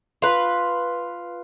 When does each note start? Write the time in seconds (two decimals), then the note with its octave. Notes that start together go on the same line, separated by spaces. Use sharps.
0.22 F4 B4